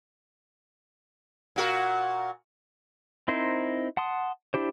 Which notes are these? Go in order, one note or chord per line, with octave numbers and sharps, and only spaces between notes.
A#2 F#4 A#4
C4 D#4 E4 A#4 C5
F#5 A5 C6 D#6
D4 E4 G4 C5